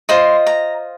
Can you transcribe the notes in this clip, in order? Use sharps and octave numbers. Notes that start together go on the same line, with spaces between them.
F4 C5 D#5 C6
A#5